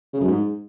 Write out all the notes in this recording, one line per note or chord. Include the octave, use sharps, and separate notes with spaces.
C#3
F#2
G#2